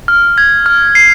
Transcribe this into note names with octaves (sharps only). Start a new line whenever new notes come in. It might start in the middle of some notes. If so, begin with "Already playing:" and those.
F6
G#6
F6
C7